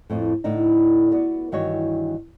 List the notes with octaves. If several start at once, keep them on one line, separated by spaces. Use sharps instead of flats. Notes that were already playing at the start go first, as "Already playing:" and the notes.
F2 A2
A2 D3 D#4
B3 F#4 D5
G2 D#3 E3 F#4 C#5